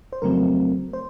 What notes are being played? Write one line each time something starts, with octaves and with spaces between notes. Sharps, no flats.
C5
F2 C#3 F#3 A3 C4 A#4
C5